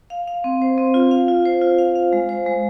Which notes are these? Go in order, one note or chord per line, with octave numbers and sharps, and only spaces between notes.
F5
F5
C4
C5
C4
F4
F5
F4
C5
F4
F5
F5
G#3
C5
G#3